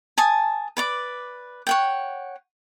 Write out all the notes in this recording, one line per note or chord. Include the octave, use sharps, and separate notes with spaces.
G#5 A5 D#6
B4 D5 D6
C#5 F#5 G5